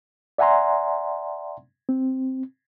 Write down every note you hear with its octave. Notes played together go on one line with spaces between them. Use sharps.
D5 E5 F#5 G#5 A#5 C6
C4